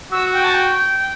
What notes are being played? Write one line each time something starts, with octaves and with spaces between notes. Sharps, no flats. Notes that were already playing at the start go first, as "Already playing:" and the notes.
F#4 E6
G5
A5
G5